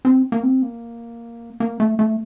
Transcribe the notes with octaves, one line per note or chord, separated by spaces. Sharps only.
C4
A#3
C4
A#3
A#3
A3
A3